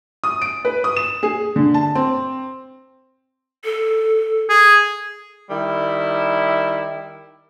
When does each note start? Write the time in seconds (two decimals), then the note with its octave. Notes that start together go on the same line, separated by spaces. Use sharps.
0.24 D#6
0.42 D7
0.65 B4
0.84 D#6
0.96 E7
1.23 G#4
1.56 D3
1.74 A5
1.95 C4
3.65 A4
4.50 G#4
5.50 D#3 G3 E4